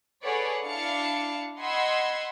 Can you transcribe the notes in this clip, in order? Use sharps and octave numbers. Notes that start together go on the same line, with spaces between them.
G#4 A4 B4 C#5 D5 F#5
D4 E4 F5 A5 C#7
D#5 F#5 B5 C6 E6 G#6